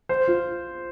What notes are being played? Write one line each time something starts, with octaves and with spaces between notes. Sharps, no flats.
C5
F4